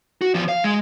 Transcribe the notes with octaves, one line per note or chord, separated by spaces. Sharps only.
F#4
E2 F3
F5
G#3